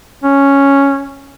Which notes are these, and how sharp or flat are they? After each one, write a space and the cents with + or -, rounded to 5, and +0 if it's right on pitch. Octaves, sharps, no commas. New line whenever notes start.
C#4 +0